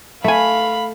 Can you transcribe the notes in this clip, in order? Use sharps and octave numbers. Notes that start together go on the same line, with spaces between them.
A3 E5 F5 G#5 B5